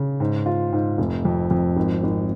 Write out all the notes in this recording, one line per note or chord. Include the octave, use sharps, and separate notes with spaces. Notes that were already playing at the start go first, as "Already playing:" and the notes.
Already playing: C#3
G#2
F4
G#2
F1
F2
F2
G#1
G#1